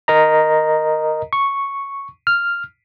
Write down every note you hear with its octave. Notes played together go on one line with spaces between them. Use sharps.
A#4 D#5 A#5
C#6
F6